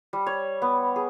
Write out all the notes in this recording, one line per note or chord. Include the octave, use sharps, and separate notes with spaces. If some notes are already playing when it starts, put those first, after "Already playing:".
G3
C#5
B3
G#4